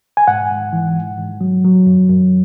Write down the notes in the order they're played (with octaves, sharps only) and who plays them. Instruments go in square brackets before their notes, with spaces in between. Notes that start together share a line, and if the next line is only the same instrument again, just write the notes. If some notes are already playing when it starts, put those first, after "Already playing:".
[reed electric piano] G#5
G#2 F#5
G#2
E3
G#2
G#2
F#3
F#3
F#2
F#2